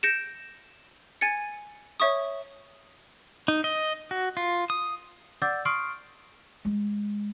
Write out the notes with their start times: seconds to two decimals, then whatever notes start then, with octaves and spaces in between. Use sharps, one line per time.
0.03 G6 A#6 C#7 D7 E7
1.21 G#5 G#6 A6 C#7
2.00 C#5 E5 C#6 D#6
3.48 D#4
3.64 D#5
4.11 F#4
4.37 F4
4.70 D#6
5.42 D5 F#5 D6 E6 G6 A6
5.65 C6 C#6 D#6 F6 C7 D7
6.65 G#3